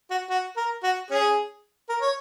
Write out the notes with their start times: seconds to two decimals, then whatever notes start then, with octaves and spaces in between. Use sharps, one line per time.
0.11 F#4
0.30 F#4
0.57 A#4
0.83 F#4
1.11 C#4 G#4
1.89 A#4
2.01 C#5